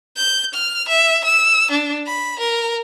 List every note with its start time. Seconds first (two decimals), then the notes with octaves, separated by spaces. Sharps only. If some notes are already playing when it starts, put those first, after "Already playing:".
0.16 G6
0.54 F6
0.88 E5
1.24 E6
1.71 D4
2.06 B5
2.39 A#4